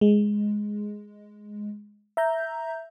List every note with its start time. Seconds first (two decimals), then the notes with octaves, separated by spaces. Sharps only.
0.01 G#3
2.17 E5 A#5 G6